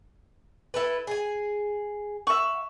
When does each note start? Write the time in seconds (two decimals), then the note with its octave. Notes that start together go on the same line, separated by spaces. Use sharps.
0.74 E4 A4 B4
1.07 G#4 G#5
2.27 E5 F#5 C#6